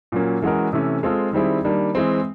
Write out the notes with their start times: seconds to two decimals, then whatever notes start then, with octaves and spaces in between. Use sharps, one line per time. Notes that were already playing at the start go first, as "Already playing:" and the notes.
0.12 A#2 F#3 A#3 C#4
0.42 E3 G#3 C#4 F#4 A#4
0.73 C3 E3 A3 C#4
1.03 G#3 C4 F4 A4
1.33 D#3 G3 C4 E4 G#4
1.64 D#3 G3 A#3 D4
1.95 E3 G#3 C4